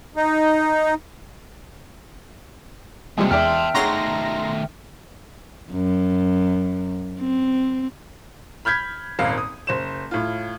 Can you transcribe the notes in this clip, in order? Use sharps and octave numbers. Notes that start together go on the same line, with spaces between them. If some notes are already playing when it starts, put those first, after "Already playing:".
D#4
C3 F3 G3 G#3 A#3 G4 A4
E2 G#3 D5 E5 G5 A5 C6 F6
D#3 A3 G#4 C#5 F#5 A#5 C6 A#6
F#2
C4
B5 F6 G6 G#6 B6
D#1 G#1 F5
D#6
F#1 C5 E7
A2 F4